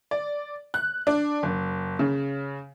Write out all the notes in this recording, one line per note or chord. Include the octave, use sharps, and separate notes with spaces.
D5
F#6
D4
F#1
C#3